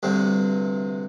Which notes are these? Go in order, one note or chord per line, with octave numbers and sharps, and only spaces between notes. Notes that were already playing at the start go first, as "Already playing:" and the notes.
D2 G2 C3